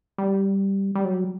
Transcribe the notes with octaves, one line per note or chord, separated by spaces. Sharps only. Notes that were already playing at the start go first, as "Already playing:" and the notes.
G3
G3
F#3